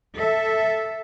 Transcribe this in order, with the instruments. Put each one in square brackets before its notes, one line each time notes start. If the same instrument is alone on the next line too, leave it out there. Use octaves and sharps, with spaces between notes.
[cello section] A4 E5